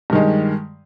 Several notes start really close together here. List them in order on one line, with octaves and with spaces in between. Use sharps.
G2 D#3 G#3